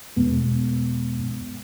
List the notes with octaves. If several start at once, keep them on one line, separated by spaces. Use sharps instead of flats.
E2 B2 G#3 B3